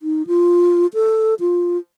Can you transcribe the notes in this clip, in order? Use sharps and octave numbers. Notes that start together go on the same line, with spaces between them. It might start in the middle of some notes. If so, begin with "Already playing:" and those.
D#4
F4
A4
F4